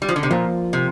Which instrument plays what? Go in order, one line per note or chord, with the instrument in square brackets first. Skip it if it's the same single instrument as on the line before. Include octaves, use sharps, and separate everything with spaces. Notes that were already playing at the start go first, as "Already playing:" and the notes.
[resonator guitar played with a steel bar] G3
F3
D3
C3
[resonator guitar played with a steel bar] A#2 [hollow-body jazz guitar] F3 A#3 F4
[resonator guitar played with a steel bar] C3